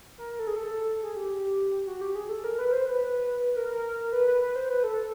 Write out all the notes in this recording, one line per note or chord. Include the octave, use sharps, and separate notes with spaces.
A#4
A#4
A4
G#4
A4
G#4
G4
F#4
G4
G#4
A4
A#4
B4
C5
B4
A#4
A#4
B4
B4
B4
C5
B4
A4